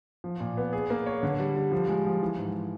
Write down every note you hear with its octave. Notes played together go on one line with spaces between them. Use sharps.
F3
A#2
B3
G#4
A#3
C#5
D3
G3
G3
F3
G#3
F3
E3
G#2